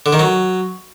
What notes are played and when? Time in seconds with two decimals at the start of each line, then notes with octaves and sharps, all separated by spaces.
0.06 D3
0.13 D#3
0.19 F#3